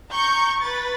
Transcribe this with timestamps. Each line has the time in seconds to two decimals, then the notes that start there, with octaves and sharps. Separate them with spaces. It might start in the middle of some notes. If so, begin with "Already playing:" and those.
0.12 A#5 C#6 G6
0.62 B4 A6